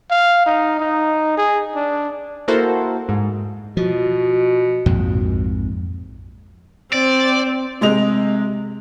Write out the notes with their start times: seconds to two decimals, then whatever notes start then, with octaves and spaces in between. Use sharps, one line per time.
0.11 F5
0.46 D#4
0.80 D#4
1.37 G#4
1.75 D4
2.48 A#3 E4 F#4 A4 A#4 C5
3.09 G#2
3.77 B2 F3
4.86 A#1 F2 G#2
6.93 C4 D5
7.81 C3 G#3 D#5 F7